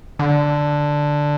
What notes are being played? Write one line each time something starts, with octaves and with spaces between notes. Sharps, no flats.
D3